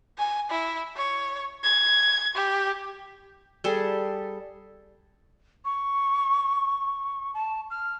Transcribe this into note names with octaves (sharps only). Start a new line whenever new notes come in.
G#5
E4
C#5
G#6
G4
G3 G#4 A4
C#6
A5
F6